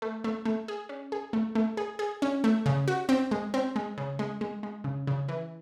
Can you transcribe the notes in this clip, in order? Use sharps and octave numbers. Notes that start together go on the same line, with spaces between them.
A3
A3
A3
G#4
C#4
G#4
A3
A3
G#4
G#4
C#4
A3
C#3
F#4
C4
G#3
C4
G#3
C#3
G#3
G#3
G#3
C#3
C#3
E3